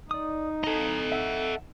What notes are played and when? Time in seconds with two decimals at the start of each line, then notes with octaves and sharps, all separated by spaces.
0.11 D#4 D5 D#6
0.64 A4 D#5 A#5
1.12 E5 F#5 E6